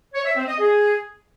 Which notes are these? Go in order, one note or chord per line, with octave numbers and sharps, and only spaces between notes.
C#5
E5
C4
D#5
G#4